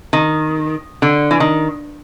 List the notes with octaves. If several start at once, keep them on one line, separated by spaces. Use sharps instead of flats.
D#3
D3
E3
D#3